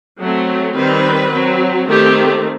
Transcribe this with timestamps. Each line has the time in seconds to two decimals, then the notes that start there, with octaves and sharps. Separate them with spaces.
0.18 F#3 A3 C4
0.74 D#3 G3 C4 B4
1.32 F#3 C4
1.87 D#3 A3 C4 G4